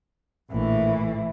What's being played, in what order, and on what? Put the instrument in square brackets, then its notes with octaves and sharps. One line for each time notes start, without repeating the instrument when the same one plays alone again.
[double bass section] A#1 [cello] A2 E3